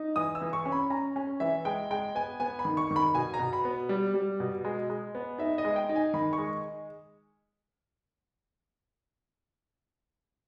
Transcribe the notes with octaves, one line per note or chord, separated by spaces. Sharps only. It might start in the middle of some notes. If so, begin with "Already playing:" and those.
Already playing: D#4
E3 D#6
E6
E3
C#6
C#4
B5
C#4 A#5
C#4
E3 E5
G#3 G5
G#3 G5
B3 G#5
B3 G#5
B5
D#3
C#6
D#3
B5
B2 G#5
A#5
B2
B5
B3
G3
G3
B2
G#3
G#3
B3
D#4 E5
D#5
G#3
G5
D#4
G#5
D#3 B5
C#6
G#3